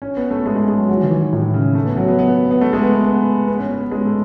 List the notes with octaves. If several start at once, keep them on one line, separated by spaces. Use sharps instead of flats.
C#4
B3
A3
G#3
G#3
G#3
F#3
F#3
E3
D#3
E3
A2
C#3
A3
B3
F#3
B3
B3
B3
A3
G#3
B3
B3
B3
B3
C#4
C#4
B3
G#3
A3